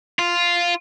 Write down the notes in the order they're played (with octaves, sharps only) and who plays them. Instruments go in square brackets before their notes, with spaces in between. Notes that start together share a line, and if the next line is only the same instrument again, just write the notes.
[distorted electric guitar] F4